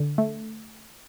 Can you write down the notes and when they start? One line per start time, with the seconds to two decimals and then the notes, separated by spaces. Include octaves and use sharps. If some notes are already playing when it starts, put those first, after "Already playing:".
Already playing: D3
0.18 A3